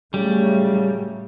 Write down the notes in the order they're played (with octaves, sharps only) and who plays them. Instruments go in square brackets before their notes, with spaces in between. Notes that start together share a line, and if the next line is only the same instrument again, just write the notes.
[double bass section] A2 F#3 A3 [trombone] C#3 [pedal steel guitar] G3